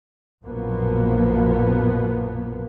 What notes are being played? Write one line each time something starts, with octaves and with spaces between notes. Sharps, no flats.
A#1 F#2 B2 F3 A#3 B3